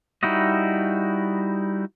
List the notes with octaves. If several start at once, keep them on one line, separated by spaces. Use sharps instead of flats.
G3 D#4 E4 F#4 D#5